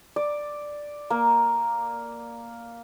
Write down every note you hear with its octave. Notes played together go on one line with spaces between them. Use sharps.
D5
A#3